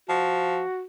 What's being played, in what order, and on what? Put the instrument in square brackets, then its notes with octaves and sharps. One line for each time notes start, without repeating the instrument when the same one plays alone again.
[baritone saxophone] F3 [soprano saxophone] F#4